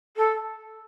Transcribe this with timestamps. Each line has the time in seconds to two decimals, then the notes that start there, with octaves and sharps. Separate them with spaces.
0.17 A4